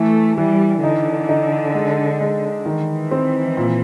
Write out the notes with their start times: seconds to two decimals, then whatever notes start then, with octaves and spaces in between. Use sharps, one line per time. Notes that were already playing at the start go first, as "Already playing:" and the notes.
Already playing: E3 A3
0.38 E3 G3
0.83 D3 D#4
1.29 D#4
1.74 G#3
2.20 G#3
2.66 D#3 E3
3.11 C4
3.57 A#2